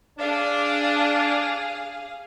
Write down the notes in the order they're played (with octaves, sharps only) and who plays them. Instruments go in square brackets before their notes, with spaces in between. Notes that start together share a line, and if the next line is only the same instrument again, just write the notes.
[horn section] D4 [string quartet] G#4 F5